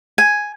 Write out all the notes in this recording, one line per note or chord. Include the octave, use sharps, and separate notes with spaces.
G#5